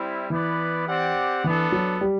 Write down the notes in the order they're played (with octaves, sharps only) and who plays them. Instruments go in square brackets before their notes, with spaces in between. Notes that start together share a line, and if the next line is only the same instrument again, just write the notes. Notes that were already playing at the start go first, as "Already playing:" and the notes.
Already playing: [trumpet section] G3 C4 E4
[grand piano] E3 [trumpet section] B3 E4 B4 D5
[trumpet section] C4 G4 D5 F#5
[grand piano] E3 [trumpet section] B3 D4 A4
[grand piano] F#3
G3